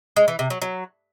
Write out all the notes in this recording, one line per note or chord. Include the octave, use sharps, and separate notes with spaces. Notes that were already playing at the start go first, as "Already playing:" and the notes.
G#3
E3
C3
F#3
F#3